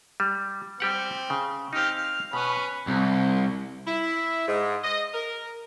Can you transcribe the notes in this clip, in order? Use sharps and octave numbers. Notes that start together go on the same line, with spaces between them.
G3
G3 C4 G4 F#5
C#3
C4 D#4 G4 F5
F5
B2 C#4 B4 B5
C2
E4
G#2
D#5
A#4